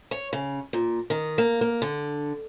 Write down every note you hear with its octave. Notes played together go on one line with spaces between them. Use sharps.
C#5
C#3
A#2
D#3
A#3
A#3
D3